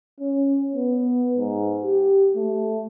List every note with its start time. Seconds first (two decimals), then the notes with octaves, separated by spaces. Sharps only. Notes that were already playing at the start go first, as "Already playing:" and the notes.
0.20 C#4
0.74 B3
1.37 G#2
1.84 G4
2.36 A3